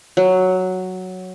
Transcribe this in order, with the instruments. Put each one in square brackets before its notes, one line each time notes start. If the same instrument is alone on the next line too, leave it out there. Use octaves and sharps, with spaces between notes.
[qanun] F#3